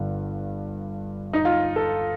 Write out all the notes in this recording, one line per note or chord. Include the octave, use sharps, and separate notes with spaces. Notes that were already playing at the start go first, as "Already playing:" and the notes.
Already playing: G1 G2 D3
D#4
F4
A4